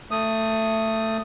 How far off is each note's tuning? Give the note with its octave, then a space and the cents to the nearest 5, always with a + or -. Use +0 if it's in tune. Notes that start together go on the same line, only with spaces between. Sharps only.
A3 +15 D#6 +0